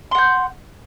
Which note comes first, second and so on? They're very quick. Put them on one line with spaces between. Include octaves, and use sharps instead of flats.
C6 F#5 G6